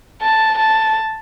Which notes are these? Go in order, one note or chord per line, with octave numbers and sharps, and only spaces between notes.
A5
A5